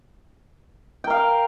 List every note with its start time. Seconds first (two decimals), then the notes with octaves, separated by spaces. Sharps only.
1.04 G5
1.07 A#4
1.10 F5